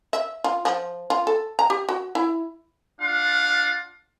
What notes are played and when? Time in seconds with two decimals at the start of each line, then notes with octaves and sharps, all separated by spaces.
0.13 E5
0.44 F4
0.65 F3
1.10 F4
1.27 A4
1.59 A#5
1.70 G4
1.89 F#4
2.15 E4
3.01 D4 F4 F5 F#5